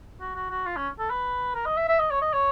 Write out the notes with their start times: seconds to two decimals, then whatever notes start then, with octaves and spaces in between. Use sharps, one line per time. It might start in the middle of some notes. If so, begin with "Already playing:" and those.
0.20 F#4
0.36 F#4
0.51 F#4
0.66 F4
0.76 C#4
0.99 A4
1.10 B4
1.55 A#4
1.66 D#5
1.77 E5
1.88 E5
2.00 D#5
2.11 C#5
2.22 D#5
2.33 C#5